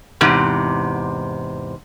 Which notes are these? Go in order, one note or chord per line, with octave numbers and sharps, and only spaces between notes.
E2 G#2 C3